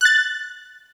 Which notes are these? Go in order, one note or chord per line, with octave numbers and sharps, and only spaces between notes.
F#6 A6